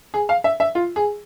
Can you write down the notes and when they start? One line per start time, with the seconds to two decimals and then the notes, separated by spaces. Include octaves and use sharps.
0.14 G#4
0.29 F5
0.44 E5
0.60 E5
0.75 F4
0.96 G#4